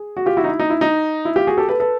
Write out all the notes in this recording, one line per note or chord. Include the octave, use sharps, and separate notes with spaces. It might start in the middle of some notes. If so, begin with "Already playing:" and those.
Already playing: G#4
F#4
F4 G4
E4 F#4
D#4
E4
D#4
E4
D#4
E4
F4 G4
F#4 G#4
G4 A4
A4 B4
A4 B4